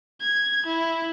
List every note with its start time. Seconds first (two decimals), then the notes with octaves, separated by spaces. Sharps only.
0.21 G#6
0.66 E4